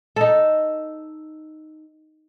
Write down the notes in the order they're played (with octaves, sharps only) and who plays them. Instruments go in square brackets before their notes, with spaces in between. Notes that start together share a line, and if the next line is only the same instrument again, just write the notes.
[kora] D#4 A4